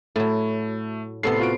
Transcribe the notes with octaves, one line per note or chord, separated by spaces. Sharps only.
A2 F#3 A3
A2 C3 B3 A4 C7
F4 F#4 D7